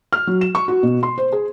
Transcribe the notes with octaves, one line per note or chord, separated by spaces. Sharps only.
F6
F#3
E7
C#6
F#4
B2
C6
C5
G#4